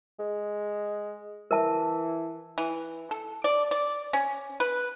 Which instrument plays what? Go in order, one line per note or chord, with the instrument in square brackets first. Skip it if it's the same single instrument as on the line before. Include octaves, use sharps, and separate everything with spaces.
[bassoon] G#3
[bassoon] E3 [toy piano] A#4 E5 A5
[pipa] E3
A4
D5
D5
C#4
B4